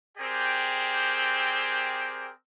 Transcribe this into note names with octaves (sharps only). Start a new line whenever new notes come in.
C4 G4 G#4 A#4 D5